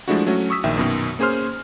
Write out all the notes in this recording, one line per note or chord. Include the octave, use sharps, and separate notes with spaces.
F3 G#3 A3 D4 E4 F#4
F#3 A3 C#4 F#4
C#6 D#6 E6 B6
A#1 D#3 E5 G5
F#2 B2 D#3
A#3 C#4 G#4 C5 C6 F6